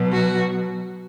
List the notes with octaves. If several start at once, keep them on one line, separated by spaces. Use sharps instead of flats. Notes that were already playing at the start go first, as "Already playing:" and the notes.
Already playing: B2 F#3
F#4